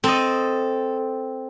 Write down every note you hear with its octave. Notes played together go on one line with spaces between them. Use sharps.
C4 A4 D#5